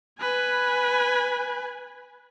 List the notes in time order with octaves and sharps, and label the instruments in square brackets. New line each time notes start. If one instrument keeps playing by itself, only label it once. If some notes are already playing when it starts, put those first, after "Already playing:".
[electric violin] B4 G#5